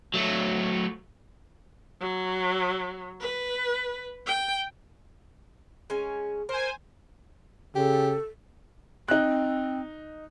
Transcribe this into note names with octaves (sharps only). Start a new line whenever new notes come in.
F#3 A3
F#3
B4
G5
G#3 C#4 G#5
A#4 C5 G#5
C#3 G4 A4
C4 D#4 F#6